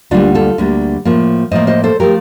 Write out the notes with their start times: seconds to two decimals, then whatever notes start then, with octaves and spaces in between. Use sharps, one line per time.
0.11 D2 D3 G3 A#3 D4 F4
0.35 F4 A4
0.58 D2 D3 G3 A#3
1.05 A2 F3 A#3
1.51 A2 F3 A#3 C5 D#5
1.67 C5 D#5
1.84 A4 C5
2.00 F3 A3 G4 A#4